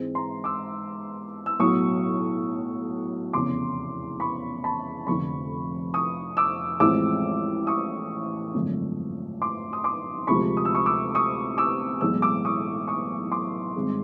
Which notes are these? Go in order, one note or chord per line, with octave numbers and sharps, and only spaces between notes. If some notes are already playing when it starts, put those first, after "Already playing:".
Already playing: G#2 E3 G#3 C4
A#5 C6
D6 E6
E6
B1 A2 F#3 C#6 D#6
F1 E2 C#3 C6 D6
B5 C#6
A5 B5
F1 F2 D3 B5 C#6
C#6 D#6
D6 E6
A1 A2 F3 G#3 C4 D6 E6
C#6 D#6
G#1 F#2 D3 F3 A3
C6 D6
D#6
C6 D6
D2 C3 F3 G#3 B5 C#6
D#6
E6
C#6 D#6
D6 E6
C#6 D#6
D6 E6
B1 A2 E3 G#3 E6
D6 E6
C#6 D#6
C#6 D#6
C6 D6
G#1 G2 D#3 G#3 C4